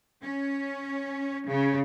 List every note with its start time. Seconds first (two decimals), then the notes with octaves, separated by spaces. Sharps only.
0.23 C#4
1.49 C#3